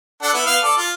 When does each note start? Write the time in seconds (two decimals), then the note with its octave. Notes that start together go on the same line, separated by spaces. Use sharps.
0.22 D4 A4 F#5
0.34 B3 E4
0.46 B3 F5
0.64 A4 D5
0.77 F4